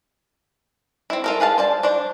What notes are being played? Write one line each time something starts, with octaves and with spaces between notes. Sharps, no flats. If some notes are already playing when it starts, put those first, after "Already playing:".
C4 E4
F4 A4 A#4
G#4 B4 F5 A5
C5 D5 A5
D4 C5 D5